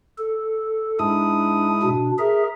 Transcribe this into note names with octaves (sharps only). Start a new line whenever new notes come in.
A4
G#2 D4 E4 D#6
B2 D4
G#4 A#4 E5